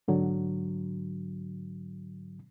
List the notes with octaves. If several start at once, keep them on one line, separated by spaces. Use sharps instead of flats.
G#2 D3 F#3